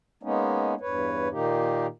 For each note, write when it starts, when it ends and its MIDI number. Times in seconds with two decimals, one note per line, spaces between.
0.23 0.74 56
0.23 0.74 58
0.23 0.74 59
0.23 0.74 61
0.23 0.74 63
0.81 1.28 40
0.81 1.28 43
0.81 1.28 71
0.81 1.28 73
1.31 1.86 46
1.31 1.86 51
1.31 1.86 58
1.31 1.86 63
1.31 1.86 67